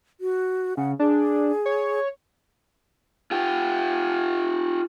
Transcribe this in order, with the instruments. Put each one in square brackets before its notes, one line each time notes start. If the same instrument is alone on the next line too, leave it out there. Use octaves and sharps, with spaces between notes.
[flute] F#4
[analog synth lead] C#3 [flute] F#5
[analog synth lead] D4 [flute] G#4
[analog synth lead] C#5
[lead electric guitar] F4 G4